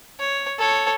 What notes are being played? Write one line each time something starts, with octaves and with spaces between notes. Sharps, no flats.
C#5
A4 C#5